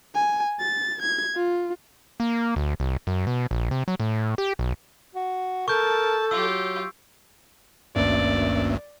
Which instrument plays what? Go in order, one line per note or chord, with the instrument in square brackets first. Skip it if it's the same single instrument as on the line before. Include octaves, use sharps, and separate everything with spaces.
[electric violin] G#5
A6
G#6
F4
[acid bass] A#3
D2
C2
F#2
B2
A#1
C3
F#3
A2
G4
B1
[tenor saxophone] F#4
[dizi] A4 [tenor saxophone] A#4 [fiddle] A5 [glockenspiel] C#6 G6
[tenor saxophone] F#3 [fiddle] F4 G4 [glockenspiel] E6
[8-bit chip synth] G#1 D2 G2 [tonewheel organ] A#3 C#4 E5 [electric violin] D5